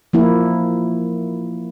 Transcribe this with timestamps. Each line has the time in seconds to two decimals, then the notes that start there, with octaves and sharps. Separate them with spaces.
0.13 F3 A#3 E4